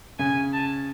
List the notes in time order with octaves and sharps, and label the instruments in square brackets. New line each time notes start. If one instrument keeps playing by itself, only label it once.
[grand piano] C#3 [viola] G#5
[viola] A5